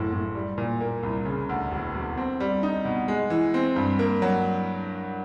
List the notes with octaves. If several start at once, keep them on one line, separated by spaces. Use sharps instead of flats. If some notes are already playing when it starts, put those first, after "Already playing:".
Already playing: F#1 A2 F#3
A2
G3
A#2
A#3
C2
C#3
D2
E1
E1
C4
G3
D#4
B2
G#3
E3
C4
G2
A#3
F#3